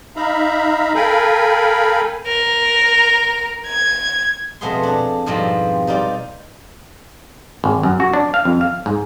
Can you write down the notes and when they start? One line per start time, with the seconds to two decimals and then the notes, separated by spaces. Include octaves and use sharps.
0.16 D#4 E5 F5 A#5 B5
0.95 A4 A#4 F5 G5 G#5 B5
2.26 A#4
3.67 G#6
4.61 F2 B2 A3 B3 G#4 C6
4.83 D4 A#5
5.26 F2 G#2 B2 F3 G3 C4
5.87 G3 D#4 F4 D5
7.64 G#1
7.83 F#2
8.00 F#4
8.13 D4
8.34 F5
8.45 F2
8.61 F5
8.86 G#2